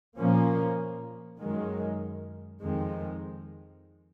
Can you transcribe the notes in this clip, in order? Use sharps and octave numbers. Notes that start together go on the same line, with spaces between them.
A#2 F3 A#3 C#4
F#2 D#3 G#3
F2 D#3 G#3 C4